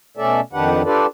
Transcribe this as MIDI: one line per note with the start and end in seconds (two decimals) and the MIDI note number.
0.17 0.40 47
0.17 0.40 57
0.17 0.40 61
0.17 0.40 69
0.17 0.40 74
0.17 0.40 76
0.53 0.82 41
0.53 0.82 51
0.53 0.82 62
0.53 0.82 67
0.53 0.82 71
0.53 0.82 78
0.84 1.06 62
0.84 1.06 65
0.84 1.06 67
0.84 1.06 69
0.84 1.06 71
0.84 1.06 74